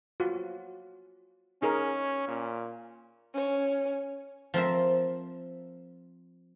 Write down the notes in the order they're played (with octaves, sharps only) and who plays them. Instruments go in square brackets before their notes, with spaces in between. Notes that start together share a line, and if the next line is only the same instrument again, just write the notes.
[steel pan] F4 F#4
[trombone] C#4 [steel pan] D#4 G#4 A#4
[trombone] A#2
[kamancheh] C#4 C#5
[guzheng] F3 C4 A#4 E5